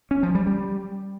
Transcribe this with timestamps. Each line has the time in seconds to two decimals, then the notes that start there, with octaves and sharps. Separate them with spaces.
0.11 C#4
0.23 F3
0.35 G3
0.47 G3